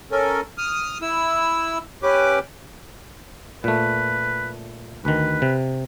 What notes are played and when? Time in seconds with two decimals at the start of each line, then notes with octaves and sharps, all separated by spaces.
0.11 C#4 A4 A#4
0.58 D#6 F6
1.02 E4 E6
2.03 C#4 G4 B4 D6
3.64 A#2 A3 B4
5.05 D2 D#3 B4
5.42 C3